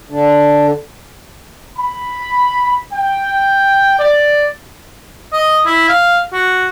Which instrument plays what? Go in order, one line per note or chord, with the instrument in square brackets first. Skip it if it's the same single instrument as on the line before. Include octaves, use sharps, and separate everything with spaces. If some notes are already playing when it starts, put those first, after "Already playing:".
[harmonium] D3 D4
[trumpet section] B5
G5
D5
[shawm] D#5
E4
F5
F#4